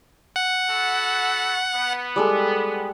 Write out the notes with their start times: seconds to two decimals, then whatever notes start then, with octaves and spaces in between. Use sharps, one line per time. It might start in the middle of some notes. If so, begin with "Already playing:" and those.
0.36 F#5
0.69 F#4 A4 B5
1.74 B3
2.16 G3 G#3 A4